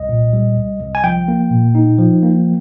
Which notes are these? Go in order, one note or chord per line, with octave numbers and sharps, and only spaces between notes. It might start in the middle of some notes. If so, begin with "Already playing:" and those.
Already playing: C2 D#5
A#2
G3
C2
C2
G#5
F3 G5
A#3
A#2
D#4
F3
A#3